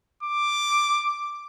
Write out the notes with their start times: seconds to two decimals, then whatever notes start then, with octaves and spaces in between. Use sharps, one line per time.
0.23 D6